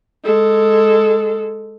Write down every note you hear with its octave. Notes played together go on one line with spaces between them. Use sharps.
G#3 A4